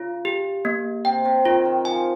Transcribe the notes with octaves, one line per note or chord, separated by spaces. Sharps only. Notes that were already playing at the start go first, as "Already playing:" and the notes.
Already playing: C#3 F4
G4
A#3
C3 G5
C3
D#3 F4
D#3
F3 G#5